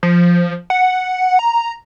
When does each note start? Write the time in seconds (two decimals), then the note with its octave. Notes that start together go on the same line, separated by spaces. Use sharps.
0.03 F3
0.70 F#5
1.39 A#5